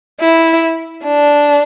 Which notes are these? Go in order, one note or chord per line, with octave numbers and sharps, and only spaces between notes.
E4
D4